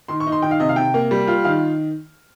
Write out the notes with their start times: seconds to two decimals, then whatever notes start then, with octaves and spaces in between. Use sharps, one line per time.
0.08 D#3 C6
0.20 C#6
0.27 D#4
0.32 C6
0.42 D#3 G5
0.51 F5
0.60 C3 D#5
0.69 F5
0.76 C3 G5
0.94 A#3
1.11 G3
1.27 F4
1.44 D#3 F5